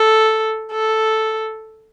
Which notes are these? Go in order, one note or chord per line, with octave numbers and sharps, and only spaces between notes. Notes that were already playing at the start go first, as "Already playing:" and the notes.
Already playing: A4
A4